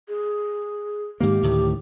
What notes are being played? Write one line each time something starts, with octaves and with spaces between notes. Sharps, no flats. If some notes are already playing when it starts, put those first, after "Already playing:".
G#4
G#2 D#3 A#3 G4
D2 A2 D#3